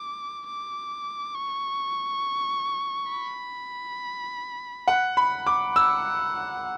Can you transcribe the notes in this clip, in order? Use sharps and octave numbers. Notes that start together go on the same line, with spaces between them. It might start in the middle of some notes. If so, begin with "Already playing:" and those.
Already playing: D6
D6
C#6
B5
F#5
B5
D6
F#5 E6